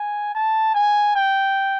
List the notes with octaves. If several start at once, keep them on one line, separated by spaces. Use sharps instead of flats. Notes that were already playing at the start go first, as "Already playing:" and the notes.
Already playing: G#5
A5
G#5
G5